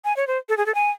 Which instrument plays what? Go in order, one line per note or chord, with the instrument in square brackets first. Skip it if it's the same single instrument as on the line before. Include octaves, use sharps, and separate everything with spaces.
[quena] G#5
C#5
C5
A4
G#4
A4
G#5